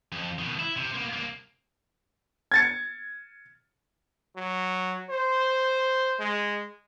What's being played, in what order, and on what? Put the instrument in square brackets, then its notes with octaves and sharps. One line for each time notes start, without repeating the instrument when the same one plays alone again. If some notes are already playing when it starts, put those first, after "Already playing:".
[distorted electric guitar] F2
B2 D#3
E4
C3
A#3 B3
C2 A#3
[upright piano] G#6 A6 C#7
[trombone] F#3
C5
G#3